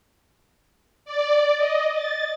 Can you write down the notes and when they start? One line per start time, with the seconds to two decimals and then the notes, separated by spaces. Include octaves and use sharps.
1.05 D5
1.57 D#5
1.93 A6